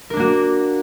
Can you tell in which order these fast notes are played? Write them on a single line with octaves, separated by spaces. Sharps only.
A#4 D4 A#3 F#4